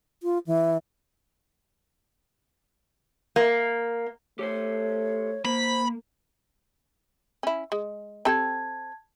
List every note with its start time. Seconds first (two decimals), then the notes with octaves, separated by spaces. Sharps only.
0.23 F4
0.47 E3
3.36 A#3
4.39 A3 G4 A4 C5 C#5
5.45 A#3 C5 B5
7.43 C#4 E4
7.72 G#3
8.25 C4 G4 A4 A5 G#6